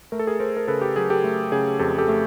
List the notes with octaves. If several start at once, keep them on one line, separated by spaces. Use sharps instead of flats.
A3 A#4
A4
G#4 A#4
A3 A#4 C5
A#4
C#3 A4 B4
G4
F#3 G#4
G4 A4
A3
C#3 G#4
F2 G4 A4
G4 A4
A3